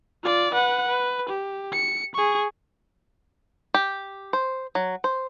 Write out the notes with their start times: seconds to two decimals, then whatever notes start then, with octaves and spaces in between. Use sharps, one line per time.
0.23 F4 D5
0.53 B4 F#5
0.88 B4
1.29 G4
1.72 C#7
2.15 G#4 C#6
3.74 G4
4.33 C5
4.75 F#3
5.04 C5